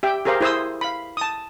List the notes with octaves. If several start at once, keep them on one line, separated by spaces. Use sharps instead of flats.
G4 E5 G5
G4 G#4 A#4 C5 F5
E4 G#4 C5 C6 D#6 E6
F5 B5
A5 D#6